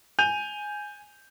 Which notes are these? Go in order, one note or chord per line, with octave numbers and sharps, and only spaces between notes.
G#5 G6 D#7 F7